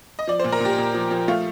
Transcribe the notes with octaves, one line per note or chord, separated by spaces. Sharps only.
D#5
F3 D5
C5
A#2
A#4
A#2 G4
A#2
F3
F3
A3 F4